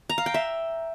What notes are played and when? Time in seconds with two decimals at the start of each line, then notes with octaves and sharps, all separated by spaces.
0.09 A#5
0.18 F5
0.26 G5
0.34 E5